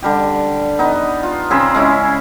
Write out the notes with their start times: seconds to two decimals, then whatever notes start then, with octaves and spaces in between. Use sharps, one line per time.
0.03 D3 G3 G4
0.79 B3 D#4
1.23 F4
1.50 C#3 C4 G#4 B5
1.75 G#3 C#4 E4